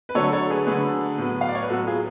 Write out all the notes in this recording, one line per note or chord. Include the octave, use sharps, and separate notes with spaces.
B4
D3 F#3 A3 A4 C#5
A4 C#5
G#4 B4
D3 F#3 A3 G#4 B4
A2 F#3 B3
F5
D5
C#5
B4
A2 F#3 B3 F#4 A4
F4 G#4